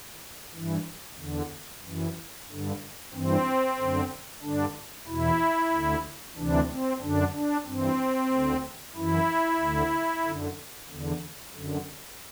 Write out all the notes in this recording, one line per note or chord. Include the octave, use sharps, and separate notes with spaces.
G2 E3
E2 D3
F#2 E3
G2 D3
G2 E3 C4
F#2 D3
G2 D3 D4
E2 B2 E4
D2 D3
D2 C3 E3 D4
C4
F#2 D3 D4
D4
G2 C4
E3
D2 D3
F#2 E3 E4
D2 D3
F#2 D3
E2 D3
F#2 D3